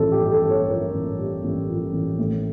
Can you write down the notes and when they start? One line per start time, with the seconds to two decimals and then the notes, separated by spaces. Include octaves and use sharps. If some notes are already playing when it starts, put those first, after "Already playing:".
Already playing: A1 G2 F3 A4
0.12 G4
0.18 G2
0.31 A4
0.44 A1
0.50 C#5
0.68 F3 A#4
0.94 A1
1.19 G2
1.44 A1
1.69 F3
1.93 A1
2.19 A2